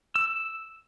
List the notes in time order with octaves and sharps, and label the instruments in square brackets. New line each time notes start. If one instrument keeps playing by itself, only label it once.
[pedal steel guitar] E6